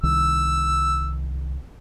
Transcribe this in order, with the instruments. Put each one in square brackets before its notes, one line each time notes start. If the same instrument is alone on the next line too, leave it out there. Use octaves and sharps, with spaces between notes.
[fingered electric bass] C2 D#3 [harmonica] E6